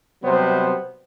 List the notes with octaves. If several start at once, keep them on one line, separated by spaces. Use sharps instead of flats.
C3 F#3 G3 B3 C5